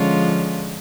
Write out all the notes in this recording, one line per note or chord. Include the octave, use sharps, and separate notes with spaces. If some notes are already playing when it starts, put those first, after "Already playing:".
Already playing: D3 F3 G#3 C#4 F4